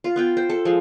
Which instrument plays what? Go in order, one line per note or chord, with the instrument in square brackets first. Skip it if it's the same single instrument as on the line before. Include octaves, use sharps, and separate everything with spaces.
[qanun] F4
B3 F4 G5
C5 G5
A4
F3 G#3